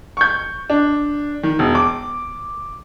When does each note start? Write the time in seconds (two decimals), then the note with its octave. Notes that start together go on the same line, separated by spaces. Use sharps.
0.17 C#6 G6
0.70 D4
1.43 D#3
1.59 E1
1.75 D6